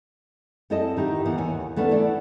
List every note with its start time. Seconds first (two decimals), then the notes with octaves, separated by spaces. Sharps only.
0.70 F#2 C4 E4 A4 D#5 A5
0.97 D#3 D#4 E4 G4
1.26 D#3 E3 B3
1.38 D#2 C#5 G#5
1.76 E3 A3 B3 C#4 D4
1.91 E4 A4 D5